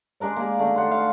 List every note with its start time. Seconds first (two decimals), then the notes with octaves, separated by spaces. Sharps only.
0.20 G#3 D4 A#4 D5
0.36 A#3 G#4
0.59 A3 D4 D#4
0.76 A4 F#5 C6
0.91 F5